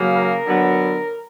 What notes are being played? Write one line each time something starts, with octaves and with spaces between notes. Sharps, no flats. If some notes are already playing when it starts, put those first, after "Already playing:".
Already playing: C#3 F#3 A#3
A#4
D3 F#3 B3